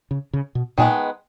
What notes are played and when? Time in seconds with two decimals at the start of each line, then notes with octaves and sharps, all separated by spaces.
0.11 C#3
0.33 C#3
0.55 B2
0.78 A#2 D#3 G#3 B3